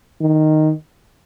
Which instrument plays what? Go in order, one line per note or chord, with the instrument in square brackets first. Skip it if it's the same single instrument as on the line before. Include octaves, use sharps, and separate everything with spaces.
[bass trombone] D#3